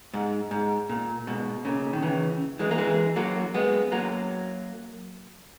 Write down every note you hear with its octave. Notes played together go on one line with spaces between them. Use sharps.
G#2
G#2
A#2
G#2 B2
A#2 C#3
D#3
C#3 E3
E3 G#3
A#3
E3 G#3
F#3 A#3
G#3 B3
F#3 A#3